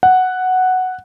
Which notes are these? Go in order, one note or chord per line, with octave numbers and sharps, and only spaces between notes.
F#5